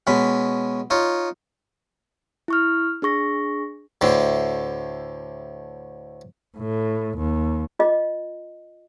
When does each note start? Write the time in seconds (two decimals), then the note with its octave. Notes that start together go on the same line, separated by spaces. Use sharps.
0.07 B2 G#3 C#4 B5
0.90 D#4 F4 C#5
2.48 E4 C#6 F6
3.02 D4 G#4 C#6 A#6
4.01 D2 A2 D3
6.57 A2
7.17 D#2
7.79 F4 D#5